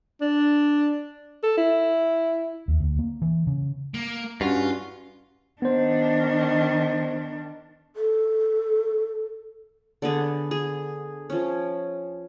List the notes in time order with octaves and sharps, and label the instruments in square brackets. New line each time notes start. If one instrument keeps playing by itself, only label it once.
[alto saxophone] D4
A4
E4
[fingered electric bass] D#2
D2
A#3
E3
C#3
[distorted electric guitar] A#3
[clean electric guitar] G2 [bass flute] C#4 [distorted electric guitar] F4 [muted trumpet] F#4
[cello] D#3 D4 [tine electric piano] B3 C5
[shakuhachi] A4
[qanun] D3 B3 G#4
G#4
F3 C#4